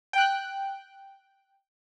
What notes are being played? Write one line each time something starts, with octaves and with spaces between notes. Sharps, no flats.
G5 F#6